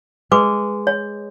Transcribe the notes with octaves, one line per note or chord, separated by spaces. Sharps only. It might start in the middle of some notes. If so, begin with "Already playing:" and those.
G#3 B4 D6
C#5